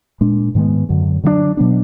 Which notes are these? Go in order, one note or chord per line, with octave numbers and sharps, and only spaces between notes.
A#2 G#3 D4
G#2 D#3 G#3 B3
F#2 D3 F#3
D3 F#3 A#3 D4
B2 F#3 B3 D4